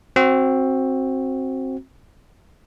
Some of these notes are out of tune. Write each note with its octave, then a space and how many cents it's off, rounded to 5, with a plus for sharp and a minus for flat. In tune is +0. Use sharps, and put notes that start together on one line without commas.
C4 +15 F#4 +0